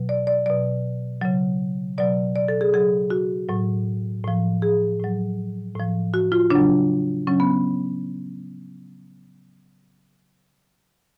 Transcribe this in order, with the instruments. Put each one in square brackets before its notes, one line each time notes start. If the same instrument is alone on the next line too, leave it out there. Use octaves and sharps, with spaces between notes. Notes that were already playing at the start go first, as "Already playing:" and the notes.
Already playing: [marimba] B2 F#3
D5
D5
B2 F#3 D5
C#3 F#3
B2 F#3 D5
D5
A4
G#4
C#3 F#3 G#4
F#4
A2 F#3
A2 F3
G#4
A2 F#3
A2 F3
F#4
F4
C#3 F#3 D4
C#3 F#3 C#4
B3